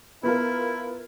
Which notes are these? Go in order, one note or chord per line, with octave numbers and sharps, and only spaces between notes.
B3 E4 F4 A#4